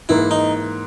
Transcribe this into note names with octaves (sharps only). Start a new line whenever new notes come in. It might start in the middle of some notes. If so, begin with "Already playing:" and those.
G#2 E3 A#3 E4
D#4